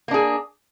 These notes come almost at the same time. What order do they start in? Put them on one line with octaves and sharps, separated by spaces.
A#3 D4 G#4